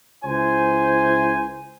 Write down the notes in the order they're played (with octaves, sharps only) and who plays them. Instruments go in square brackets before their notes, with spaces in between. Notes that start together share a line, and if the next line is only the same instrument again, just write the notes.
[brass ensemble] C#2 E4 C5 G#5